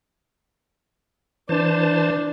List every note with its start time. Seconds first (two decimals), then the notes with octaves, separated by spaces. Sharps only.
1.49 E3 D4 C5 A5